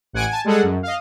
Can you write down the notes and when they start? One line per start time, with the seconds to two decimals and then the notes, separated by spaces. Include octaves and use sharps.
0.13 A1 F#5 G#5 D7
0.28 G#5 A5
0.44 G3 G#3 G#4 A4 F#5
0.63 F#2
0.83 D#5 F5